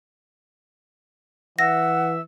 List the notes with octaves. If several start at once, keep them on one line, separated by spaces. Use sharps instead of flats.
E3 E5 F#5 E6 A#6